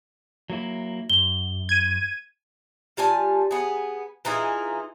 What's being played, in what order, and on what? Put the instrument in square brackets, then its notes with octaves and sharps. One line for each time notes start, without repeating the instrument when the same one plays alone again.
[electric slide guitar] F#3 A#3 E4
[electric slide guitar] F#2 [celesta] G7
[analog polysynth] G#6 D#7
[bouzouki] G3 F4 G#5 A5
B3 G#4
E3 D#4 F4 G#4